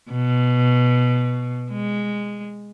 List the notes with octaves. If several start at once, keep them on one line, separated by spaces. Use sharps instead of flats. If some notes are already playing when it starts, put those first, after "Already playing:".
B2
G#3